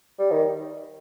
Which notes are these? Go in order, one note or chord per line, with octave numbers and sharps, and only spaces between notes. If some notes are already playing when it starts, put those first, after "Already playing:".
G3
D#3